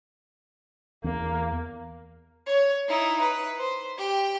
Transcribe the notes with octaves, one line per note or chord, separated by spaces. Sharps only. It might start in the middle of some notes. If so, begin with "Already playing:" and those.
E2 A#3
C#5
D#4 E4
B4
C5
G4 G5